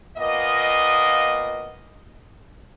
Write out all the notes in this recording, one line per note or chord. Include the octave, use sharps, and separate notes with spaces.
A#2 A#3 B3 D#5